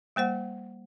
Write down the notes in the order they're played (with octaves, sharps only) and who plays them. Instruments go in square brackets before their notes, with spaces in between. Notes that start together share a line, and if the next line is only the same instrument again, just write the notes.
[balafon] G3 A#3 C5 F#5